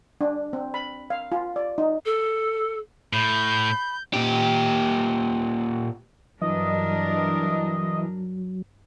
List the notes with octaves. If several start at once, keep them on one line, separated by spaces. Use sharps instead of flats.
D4
C4
B5
F5
F4
D5
D#4
A4
A2 B5 G6
A#2 G4
G2 E3 F#3 D4 A#4 D#5